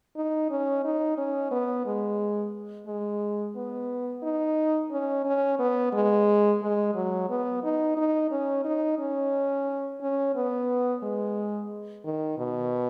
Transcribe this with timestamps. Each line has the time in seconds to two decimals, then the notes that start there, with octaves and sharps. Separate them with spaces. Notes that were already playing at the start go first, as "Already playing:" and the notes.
0.16 D#4
0.50 C#4
0.85 D#4
1.18 C#4
1.51 B3
1.86 G#3
2.87 G#3
3.56 B3
4.23 D#4
4.91 C#4
5.25 C#4
5.59 B3
5.93 G#3
6.62 G#3
6.95 F#3
7.30 B3
7.64 D#4
7.97 D#4
8.31 C#4
8.65 D#4
8.99 C#4
10.01 C#4
10.36 B3
11.03 G#3
12.05 D#3
12.38 B2